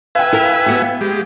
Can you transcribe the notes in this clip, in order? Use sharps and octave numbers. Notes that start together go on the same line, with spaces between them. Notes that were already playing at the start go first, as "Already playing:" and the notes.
B4 E5 F5 G5 G#5
E4 A#4
B3 F#4 G4
B3
G#3 G4